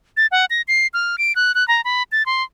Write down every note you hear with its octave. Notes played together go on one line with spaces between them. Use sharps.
A6
F#5
A#6
C7
F6
D7
F#6
F#6
A#5
B5
A6
C6